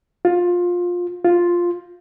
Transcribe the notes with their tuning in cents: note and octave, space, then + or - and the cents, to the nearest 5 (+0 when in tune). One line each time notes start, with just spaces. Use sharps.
F4 +15
F4 +0